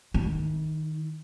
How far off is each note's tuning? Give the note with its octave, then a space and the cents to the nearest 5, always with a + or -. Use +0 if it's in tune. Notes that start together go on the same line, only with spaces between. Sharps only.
D#3 +0 E4 -40